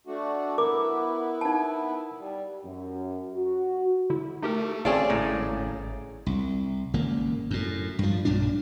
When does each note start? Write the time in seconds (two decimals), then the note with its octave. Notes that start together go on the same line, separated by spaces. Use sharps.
0.07 A3 D4 F#4
0.58 B3 E4 A#4 D6
1.41 D#4 A5
2.18 G3
2.65 F#2
3.34 F#4
4.10 D3 E4
4.43 A3 D#4 G4 A#4
4.85 G#1 A3 C4 C#4 G#4 D5 F5 A5
5.10 A2 C#3 A#5
6.26 C2
6.94 G#1 C#3 A#3
7.51 F#2 A2
7.99 G2 F3
8.25 B1 G2 A#2 D4